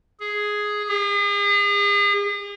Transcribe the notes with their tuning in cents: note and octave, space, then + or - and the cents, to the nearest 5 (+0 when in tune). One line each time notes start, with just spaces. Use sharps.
G#4 +5
G#4 -40